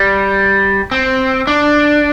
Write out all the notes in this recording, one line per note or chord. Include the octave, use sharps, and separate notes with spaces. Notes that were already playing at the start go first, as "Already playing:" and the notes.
Already playing: G3
C4
D4